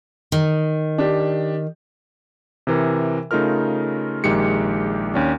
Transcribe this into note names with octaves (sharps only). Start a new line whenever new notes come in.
D#3
D4 G4
C3 E3 A#4
C#3 A3 D#4 F4 A#4 F6
A#1 D#3 G#3 G4 C#7
D#2 C#4 D4